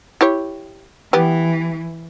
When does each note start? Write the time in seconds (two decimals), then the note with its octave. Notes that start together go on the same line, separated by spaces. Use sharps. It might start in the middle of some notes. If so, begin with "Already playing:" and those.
0.21 E4 G4 C#5
1.13 E3 G3 B3 G4